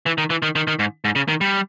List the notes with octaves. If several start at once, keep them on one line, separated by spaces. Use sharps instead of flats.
E3
D#3
E3
D#3
D#3
D#3
G#2
G#2
C#3
D#3
G3